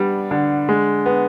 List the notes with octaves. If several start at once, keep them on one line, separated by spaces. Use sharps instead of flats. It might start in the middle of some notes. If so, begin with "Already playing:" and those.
Already playing: G3 B3 D4
D3
G#3
B3